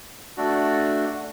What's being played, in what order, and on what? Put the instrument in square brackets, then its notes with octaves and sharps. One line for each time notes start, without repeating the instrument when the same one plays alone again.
[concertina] A3 D4 F#4